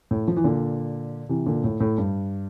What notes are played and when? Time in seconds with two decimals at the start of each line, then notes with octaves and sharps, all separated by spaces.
0.11 A2
0.28 F3
0.36 E3
0.44 A#2 D3
1.29 C3 E3
1.46 A#2 D3
1.64 A2
1.80 A2
1.98 G2